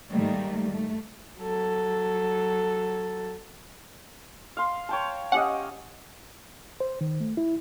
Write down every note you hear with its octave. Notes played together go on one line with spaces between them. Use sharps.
G#2 D#3 G3 A3 A#3
A3
F#3 A4
F5 C6
C#5 G5 A5
C#4 G4 D#5 F#5
C5
D#3
A3
E4